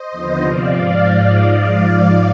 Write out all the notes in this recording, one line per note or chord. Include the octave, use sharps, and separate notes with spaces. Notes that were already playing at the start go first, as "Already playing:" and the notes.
Already playing: C5 D#5
D#2 D3 F3 B3
C3 F3 C4 D5 F5
G#2 F3 G#3